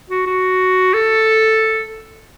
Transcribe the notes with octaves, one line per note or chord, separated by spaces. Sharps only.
F#4
F#4
A4